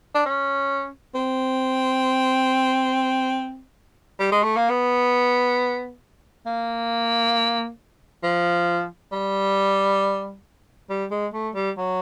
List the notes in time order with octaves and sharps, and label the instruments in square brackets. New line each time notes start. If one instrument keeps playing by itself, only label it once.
[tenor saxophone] D4
C#4
C4
G3
G#3
A3
A#3
B3
A#3
F3
G3
G3
G#3
A3
G3
F#3